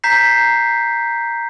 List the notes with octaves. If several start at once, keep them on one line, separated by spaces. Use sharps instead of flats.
A#5 G6 B6 C7